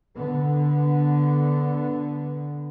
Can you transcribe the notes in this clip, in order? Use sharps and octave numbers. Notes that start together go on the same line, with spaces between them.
D3 B3